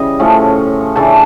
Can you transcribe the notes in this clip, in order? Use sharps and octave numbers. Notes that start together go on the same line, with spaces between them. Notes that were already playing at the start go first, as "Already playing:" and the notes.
Already playing: C#3 E3 G3 D#5
A2 F3 A3 C#4
C#3 E3 A3 D4 A5